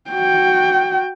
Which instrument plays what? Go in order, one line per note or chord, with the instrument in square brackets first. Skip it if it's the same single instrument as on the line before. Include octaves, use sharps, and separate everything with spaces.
[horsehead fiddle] F#4 G5